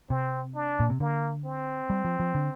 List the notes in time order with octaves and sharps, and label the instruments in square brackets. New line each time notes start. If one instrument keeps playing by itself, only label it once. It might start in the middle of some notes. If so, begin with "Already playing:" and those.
[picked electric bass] C3 [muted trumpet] C4
[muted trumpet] D4
[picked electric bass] A#2
C3
[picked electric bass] D3 [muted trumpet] A#3
[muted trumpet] C4
[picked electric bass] G3
F3
F3
D3